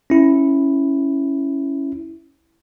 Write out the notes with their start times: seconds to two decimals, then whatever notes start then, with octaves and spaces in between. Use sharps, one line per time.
0.10 C#4 E4